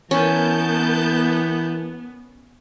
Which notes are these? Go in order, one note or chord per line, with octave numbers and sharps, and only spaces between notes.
E3 B3 C#4 A#4 A5 G6